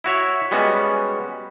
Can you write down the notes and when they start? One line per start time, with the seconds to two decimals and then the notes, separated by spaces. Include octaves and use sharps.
0.04 E4 F#4 C#5 E5
0.51 G3 G#3 B3 C#4 F#4